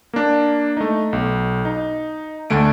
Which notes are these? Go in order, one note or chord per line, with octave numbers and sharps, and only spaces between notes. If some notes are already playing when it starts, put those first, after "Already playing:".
A#3 D4
A3 D#4
B1
D#4
D2 D3 A3 D7